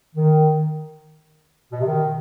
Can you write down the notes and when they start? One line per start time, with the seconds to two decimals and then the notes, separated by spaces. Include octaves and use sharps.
0.15 D#3
1.72 B2
1.79 C3
1.87 D#3